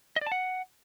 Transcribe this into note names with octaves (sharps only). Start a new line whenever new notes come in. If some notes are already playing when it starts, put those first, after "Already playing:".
D#5
D5
A5
F#5